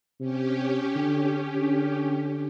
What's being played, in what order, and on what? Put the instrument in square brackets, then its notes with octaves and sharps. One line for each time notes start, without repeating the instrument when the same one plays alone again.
[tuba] C3 [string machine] C#4 G4
[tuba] D3
D3